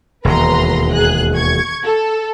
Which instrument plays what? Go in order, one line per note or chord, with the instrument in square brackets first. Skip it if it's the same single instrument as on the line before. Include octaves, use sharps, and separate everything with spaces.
[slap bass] E1 D#2 [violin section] B4 A#5 C6
[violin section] G#4 F#6
C#6 G#6
A4